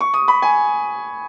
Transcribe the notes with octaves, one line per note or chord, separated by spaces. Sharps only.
C#6
D#6
B5
G#5